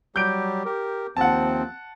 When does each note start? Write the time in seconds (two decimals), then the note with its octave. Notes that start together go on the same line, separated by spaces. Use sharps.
0.16 F#3 G3 G4 G6 D7
0.65 G4 A#4
1.17 D#2 F3 C4 F#5 A5